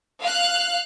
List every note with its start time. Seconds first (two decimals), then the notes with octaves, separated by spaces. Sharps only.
0.22 F5 F#6